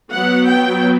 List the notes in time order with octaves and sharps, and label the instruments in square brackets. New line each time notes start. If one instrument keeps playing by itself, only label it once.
[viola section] F#3 B3 F#5
G5